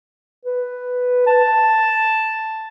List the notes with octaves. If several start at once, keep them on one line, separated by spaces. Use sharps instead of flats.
B4
A5